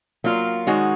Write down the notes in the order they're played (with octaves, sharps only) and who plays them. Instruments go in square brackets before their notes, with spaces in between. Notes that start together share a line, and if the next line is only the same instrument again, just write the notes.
[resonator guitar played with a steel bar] F#3 A#3 F4
D#3 G#3 D#4 F#4 C#5